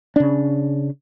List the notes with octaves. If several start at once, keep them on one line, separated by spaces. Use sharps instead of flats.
C#3 D4